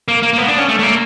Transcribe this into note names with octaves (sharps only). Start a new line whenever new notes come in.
A#3
A#3
A#3
B3
D4
C#4
A3
A3
A#3